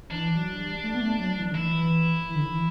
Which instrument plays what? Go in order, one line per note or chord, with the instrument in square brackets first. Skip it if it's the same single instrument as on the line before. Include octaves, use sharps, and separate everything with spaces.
[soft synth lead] E3 [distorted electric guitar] D4
[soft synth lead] F#3
G3
A3
B3
A3
F#3
E3
D3
[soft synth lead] E3 [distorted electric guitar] E4
[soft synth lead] E3
D3
E3